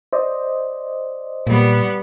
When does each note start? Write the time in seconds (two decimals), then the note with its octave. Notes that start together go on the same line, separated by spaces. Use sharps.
0.13 C5 D5 D#5
1.47 A#2 G3 B3